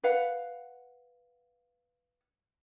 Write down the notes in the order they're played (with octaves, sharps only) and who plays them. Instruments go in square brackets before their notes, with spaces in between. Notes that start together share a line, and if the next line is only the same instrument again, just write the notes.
[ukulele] B4 F5 F#5